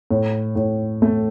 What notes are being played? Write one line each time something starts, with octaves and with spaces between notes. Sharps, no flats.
A2
A2
A3